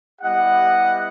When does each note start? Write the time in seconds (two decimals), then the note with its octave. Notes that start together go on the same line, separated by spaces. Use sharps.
0.21 G3 B3 E4 G4 D#5 F#5